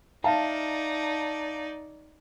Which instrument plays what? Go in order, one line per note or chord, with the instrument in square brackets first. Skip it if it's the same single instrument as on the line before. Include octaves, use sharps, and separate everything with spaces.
[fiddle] D#4 D5 [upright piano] E5 F5 A5